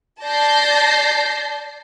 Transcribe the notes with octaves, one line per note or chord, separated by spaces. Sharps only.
D5 A5 G6 A#6 C7